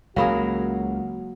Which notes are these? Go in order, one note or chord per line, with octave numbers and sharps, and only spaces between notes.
C#2 F#3 A#3 F#4 G#4 F5 B5 D#6